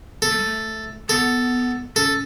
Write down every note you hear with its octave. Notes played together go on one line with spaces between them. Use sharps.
B3 A4
A3
G3
A3
B3 A4
C#4 A4